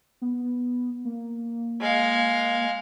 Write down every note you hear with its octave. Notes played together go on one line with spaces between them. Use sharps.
B3
A#3
G#3 F5